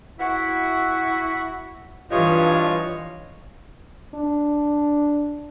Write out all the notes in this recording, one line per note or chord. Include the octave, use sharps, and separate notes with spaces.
E4 F#4 F#5
G2 E3 F4 C#5 D#5
D4